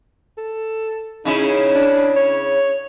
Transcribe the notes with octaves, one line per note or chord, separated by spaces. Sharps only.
A4
C#3 C#4 D#4 E4
D4
C#5